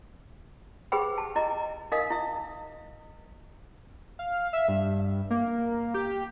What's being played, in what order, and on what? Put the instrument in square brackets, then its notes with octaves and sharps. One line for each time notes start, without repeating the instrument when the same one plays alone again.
[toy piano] G4 G#4 B4 C5 G5 B5
A5
E4 D#5 A#5
D#4 A#4 D#5 F5 D#6
E4 E5
[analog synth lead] F5
E5
G2
A#3
G4